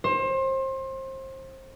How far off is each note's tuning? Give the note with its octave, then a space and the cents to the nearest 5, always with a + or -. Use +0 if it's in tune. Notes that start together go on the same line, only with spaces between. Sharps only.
C5 +30